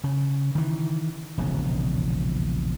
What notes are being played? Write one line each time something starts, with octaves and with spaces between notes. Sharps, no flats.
C#3
D#3 E3
E1 A#1 D#2 C#3